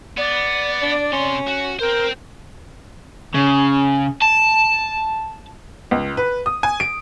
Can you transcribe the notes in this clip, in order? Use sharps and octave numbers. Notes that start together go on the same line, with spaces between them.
B3 D5
D4
C3 C#4 C6
F#4
A#4 C5 G5
C#3
A5
C#2
B4
D#6
G#5
D7